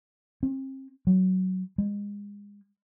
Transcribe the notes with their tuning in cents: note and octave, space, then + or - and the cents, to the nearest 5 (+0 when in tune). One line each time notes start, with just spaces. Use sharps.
C4 +35
F#3 +10
G#3 -30